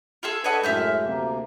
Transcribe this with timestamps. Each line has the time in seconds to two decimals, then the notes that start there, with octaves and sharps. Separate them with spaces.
0.23 F4 G#4 A4
0.44 D4 A4 B4 C#5 D#5 F#5
0.63 F#2 A2 G#3 E5 F6 G6
1.04 D2 C3 A#3